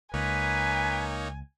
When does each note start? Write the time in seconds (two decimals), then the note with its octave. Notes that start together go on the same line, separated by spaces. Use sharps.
0.14 C#2 A#3 D#4 B4 C#5 G#5